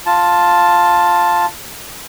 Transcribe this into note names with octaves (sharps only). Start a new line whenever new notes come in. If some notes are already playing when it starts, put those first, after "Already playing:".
F4 A5